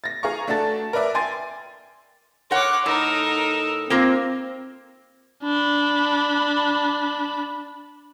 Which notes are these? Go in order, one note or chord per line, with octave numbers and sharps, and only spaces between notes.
A6 A#6
G#4 F5 A#5 C#6
A3 D4 F#4 A4 A5 A6
A#4 B4 D5 E5
G5 G#5 C6 A6
A#4 C#5 F#5 C6 D6
A2 D#4 A#4 E6
A#3 C4 F4 A#4
D4 B5